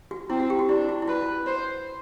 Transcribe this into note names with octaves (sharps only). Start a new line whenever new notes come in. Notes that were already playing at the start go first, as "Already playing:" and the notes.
F#4
C4 E4
F#4
G4
F#4
D4 E4
F#4
E4
F#4 B4
C5